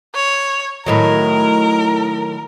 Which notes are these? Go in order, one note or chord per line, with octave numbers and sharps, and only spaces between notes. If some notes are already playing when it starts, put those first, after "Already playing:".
C#5
A2 D#3 F#3 A#4